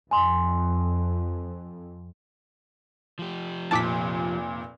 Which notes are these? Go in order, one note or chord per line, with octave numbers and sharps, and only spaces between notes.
F2 G#5 C6
F3 G4
F1 A#2 A5 D6 B6